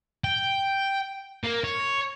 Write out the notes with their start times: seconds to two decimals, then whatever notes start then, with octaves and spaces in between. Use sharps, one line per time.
0.24 G5
1.44 A#3
1.64 C#5